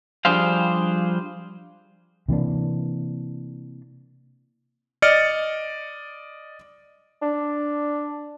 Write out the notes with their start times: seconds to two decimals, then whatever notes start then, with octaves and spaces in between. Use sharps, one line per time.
0.25 F3 G3 D4 G#4 C5 F5
2.28 C3 E3 A#3 D4
5.02 D5 D#5 F6 A6 C#7
7.22 D4